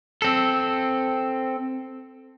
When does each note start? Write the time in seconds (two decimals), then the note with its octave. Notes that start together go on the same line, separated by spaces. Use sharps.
0.22 C4 A4